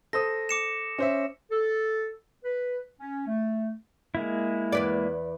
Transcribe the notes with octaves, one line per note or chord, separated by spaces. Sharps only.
A4 C5 D#6 A#6
D6 C#7 E7
C#4 C5 E5
A4
B4
C#4
A3
G#3 A#3 E4
E2 B4 D5